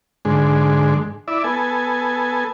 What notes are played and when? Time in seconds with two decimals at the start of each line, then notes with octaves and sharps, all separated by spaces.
0.25 G#2 D3 G#3
1.28 E4 D5 E5
1.44 B3 A4 G#5